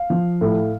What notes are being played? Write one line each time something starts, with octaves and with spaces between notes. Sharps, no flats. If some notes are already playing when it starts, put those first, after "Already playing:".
Already playing: F5
F3
A2